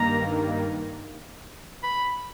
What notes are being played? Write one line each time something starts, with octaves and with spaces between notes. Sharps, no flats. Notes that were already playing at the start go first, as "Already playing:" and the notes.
Already playing: G2 D#3 A#3 A#5
B5